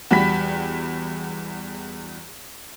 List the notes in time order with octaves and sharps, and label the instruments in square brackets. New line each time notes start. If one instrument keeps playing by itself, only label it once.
[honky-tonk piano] E2 G3 F#4 B5 B6